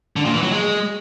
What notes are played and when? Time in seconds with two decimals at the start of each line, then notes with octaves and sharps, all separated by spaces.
0.16 D3
0.25 A#2
0.34 E3
0.43 F#3
0.51 G#3